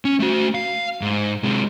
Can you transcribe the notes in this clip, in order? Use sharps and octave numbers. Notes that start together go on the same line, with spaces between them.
C#4
A3 F#4
F5
G#2
C3 G#3